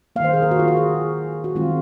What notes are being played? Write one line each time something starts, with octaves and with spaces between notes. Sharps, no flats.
D#3 A#3 C5 F5
G#4
A#4
F#4
F4
F#4
G#4
F#4
D#3 G#3 C4 F4